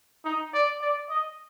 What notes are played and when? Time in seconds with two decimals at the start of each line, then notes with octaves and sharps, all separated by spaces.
0.25 D#4
0.53 D5
0.81 D5
1.10 D#5